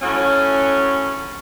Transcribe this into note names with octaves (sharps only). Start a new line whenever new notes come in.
A2 F#3 C#4